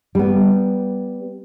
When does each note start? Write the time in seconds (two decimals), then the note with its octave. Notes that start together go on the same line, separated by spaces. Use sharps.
0.15 G3 B3